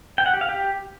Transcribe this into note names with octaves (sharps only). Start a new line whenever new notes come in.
G5
F#5
G4
F5
G4